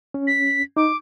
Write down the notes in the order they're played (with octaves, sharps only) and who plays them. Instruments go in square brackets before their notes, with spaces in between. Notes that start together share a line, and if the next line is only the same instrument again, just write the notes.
[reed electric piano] C#4
[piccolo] B6
[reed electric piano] D#4 [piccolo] D6